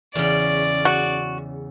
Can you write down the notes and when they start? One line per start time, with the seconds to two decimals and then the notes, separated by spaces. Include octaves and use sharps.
0.15 E2 C#3 D5
0.85 F#4